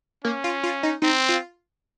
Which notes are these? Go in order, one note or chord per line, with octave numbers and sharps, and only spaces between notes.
A#3 C#4
F4
F4
D#4
C4 D#4
F4